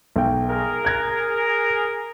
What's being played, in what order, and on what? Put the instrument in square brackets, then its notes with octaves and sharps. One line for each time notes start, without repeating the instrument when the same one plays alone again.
[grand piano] B1 G5
[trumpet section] G#4 A#4
[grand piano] F#6 G#6 A#6